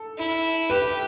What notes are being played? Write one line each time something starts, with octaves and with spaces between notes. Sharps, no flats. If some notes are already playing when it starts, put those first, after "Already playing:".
Already playing: A4
E4
G4 B4